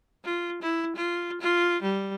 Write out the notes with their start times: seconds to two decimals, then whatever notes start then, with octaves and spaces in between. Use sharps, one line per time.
0.25 F4
0.62 E4
0.96 F4
1.41 F4
1.82 G3